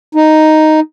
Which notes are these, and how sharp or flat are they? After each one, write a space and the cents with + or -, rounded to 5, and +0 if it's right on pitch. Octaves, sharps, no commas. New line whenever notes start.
D#4 +0